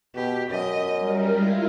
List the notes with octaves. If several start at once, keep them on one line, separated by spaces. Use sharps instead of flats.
B2 G4
F#2 D#5
G3 A#4
G#3 E4 F4